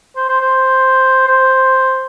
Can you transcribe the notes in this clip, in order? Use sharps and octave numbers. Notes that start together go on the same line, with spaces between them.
C5
C5
C5
C5